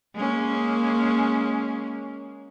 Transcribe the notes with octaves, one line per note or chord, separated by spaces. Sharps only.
G#3 A#3 C#4